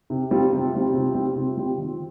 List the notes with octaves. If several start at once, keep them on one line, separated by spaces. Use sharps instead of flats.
C3
G3 C4 F4
C3
G3 C4 F4
C3
G3 C4 F4
C3
G3 C4 F4
D#3